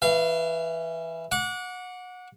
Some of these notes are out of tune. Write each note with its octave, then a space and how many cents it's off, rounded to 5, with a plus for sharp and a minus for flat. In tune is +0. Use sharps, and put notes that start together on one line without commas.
E3 -5 F5 -30
F#5 -25 D6 -25